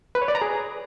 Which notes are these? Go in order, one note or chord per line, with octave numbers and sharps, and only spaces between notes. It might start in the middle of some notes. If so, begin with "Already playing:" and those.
B4
C#5
D5
A#5
G#4